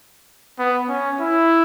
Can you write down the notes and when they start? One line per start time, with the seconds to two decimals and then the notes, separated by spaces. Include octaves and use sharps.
0.59 B3
0.89 C#4
1.20 E4